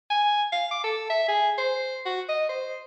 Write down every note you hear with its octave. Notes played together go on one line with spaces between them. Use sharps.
G#5
F5
D6
A4
E5
G#4
C5
F#4
D#5
C5